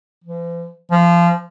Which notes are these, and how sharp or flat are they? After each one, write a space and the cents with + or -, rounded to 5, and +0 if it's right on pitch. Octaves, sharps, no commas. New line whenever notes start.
F3 -45
F3 -20